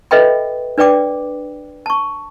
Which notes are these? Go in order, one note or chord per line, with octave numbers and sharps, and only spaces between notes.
A4 B4 D#5 E5 G5 B5
D4 B4 D5 G5 D6
A5 C#6